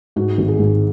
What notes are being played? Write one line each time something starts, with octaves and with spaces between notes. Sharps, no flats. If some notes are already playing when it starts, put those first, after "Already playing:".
G#2 F#4
G#1
G#4
G#2